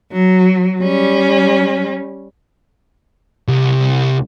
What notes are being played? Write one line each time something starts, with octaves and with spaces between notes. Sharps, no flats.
F#3
G3 C#4
C2